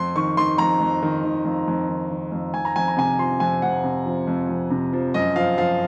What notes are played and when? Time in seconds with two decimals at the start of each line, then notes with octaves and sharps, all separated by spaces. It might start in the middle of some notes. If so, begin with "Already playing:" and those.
Already playing: F2 C6
0.16 D#3 C#6
0.37 D#3 C6
0.58 F2 A#5
0.81 F2
1.02 D#3
1.24 D#3
1.45 F2
1.67 F2
1.89 D#3
2.10 D#3
2.32 F2
2.54 F2 G#5
2.65 A#5
2.76 F2 G#5
2.88 A#5
2.97 C3 G#5
3.19 F3 C6
3.40 F2 G#5
3.62 F2 F#5
3.84 C3
4.06 F3
4.27 F2
4.49 F2
4.70 C3
4.93 F3
5.14 F#2 D#5
5.36 F3 F5
5.58 F3 F5